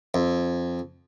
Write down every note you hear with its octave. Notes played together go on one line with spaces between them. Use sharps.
F2